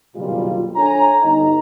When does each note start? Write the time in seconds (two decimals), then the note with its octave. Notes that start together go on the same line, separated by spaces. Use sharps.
0.15 F#1 B1 A#2 D#3 G3 F4
0.76 D4 A4 C#5 G#5 A#5
1.22 G1 D#4 A#5